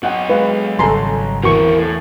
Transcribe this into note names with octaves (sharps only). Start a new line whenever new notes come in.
F#3 D#5 F#5 G5
G#3 B4 F5
G#1 C#3 G3 A4 G#5 A#5 C6
E2 C4 F#4 A#4 C#6
A2 A4